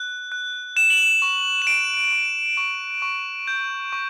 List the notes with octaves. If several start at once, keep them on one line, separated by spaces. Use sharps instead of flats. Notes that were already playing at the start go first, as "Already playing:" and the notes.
Already playing: F#6
F#6
F#6 E7
F#7
E7
C#6
E7
C#6 D7
C#6
C#6
C#6
G6
C#6